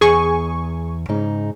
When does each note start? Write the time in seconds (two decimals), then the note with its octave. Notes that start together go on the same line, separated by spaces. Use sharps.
0.01 E2 G#4 G#5 C#6
1.09 G#2 C#3 D#4